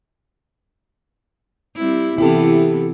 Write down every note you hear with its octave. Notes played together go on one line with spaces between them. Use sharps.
G3 C4 E4
C3 E3 B3 E4 G4 A4